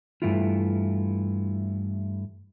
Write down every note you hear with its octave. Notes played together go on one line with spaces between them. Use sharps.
G2 D#3 E3 A3 E4 F4